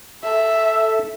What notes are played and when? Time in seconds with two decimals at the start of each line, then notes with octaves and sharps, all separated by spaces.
0.24 A4 E5